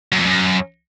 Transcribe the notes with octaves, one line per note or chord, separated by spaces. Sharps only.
F#2
F2
F#2